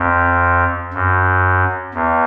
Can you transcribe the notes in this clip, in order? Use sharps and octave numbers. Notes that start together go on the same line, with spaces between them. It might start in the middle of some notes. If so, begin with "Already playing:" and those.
Already playing: F2
F#2
E2